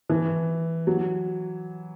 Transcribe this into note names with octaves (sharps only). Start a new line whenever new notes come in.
E3
F#3